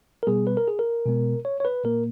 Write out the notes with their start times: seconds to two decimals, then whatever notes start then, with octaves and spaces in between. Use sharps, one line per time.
0.23 A#4
0.27 B2 G3 B3 G#4
0.47 B4
0.57 A#4
0.68 G#4
0.79 A#4
1.06 B2 G#3 B3
1.45 C#5
1.60 C#5
1.65 B4
1.84 A#2 A#3 A#4